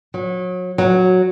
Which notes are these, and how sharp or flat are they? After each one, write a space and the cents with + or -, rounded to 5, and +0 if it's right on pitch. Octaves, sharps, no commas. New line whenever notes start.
F#3 -30
F#3 -10